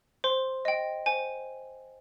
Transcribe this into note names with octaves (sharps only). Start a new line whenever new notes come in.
C5 C6
D#5 G5
C5 G#5